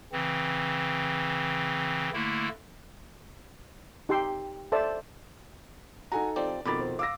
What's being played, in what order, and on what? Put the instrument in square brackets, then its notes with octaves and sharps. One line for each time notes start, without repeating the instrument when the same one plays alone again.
[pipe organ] C#3 E3 C4
D3 A3 A#3 E4
[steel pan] D#4 G4 G5 C6 E6
A4 C5 D5 E5 A5
[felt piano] D#4 A4 A#5 [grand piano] F#4 G#5
[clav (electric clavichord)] F3 C4 G4 [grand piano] D5
[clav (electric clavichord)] F2 D#3 [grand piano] B2 [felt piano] B5 D6 A6
[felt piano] C5
[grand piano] F5 E6 [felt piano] D6 A#6